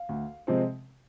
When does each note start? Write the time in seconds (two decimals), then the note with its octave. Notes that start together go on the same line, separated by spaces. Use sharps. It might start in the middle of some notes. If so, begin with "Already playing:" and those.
Already playing: F5
0.09 D2
0.47 C3 F3 G#3 C4